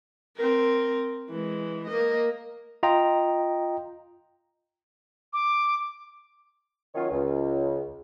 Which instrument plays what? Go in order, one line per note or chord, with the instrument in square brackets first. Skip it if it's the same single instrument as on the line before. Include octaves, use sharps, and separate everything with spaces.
[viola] C4 A#4
E3 G#3
A#3 D#5
[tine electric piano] F4 D#5 G5 A#5
[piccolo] D6
[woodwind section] D#3 F#3 C#4 F4 C#5
C#2